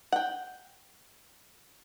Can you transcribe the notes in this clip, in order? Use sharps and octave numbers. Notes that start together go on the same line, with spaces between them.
F#5 G5